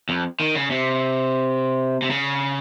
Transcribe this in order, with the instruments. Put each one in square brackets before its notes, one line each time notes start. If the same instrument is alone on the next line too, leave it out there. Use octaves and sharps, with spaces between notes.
[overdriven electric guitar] F2
D#3
C#3
C3
C3
C#3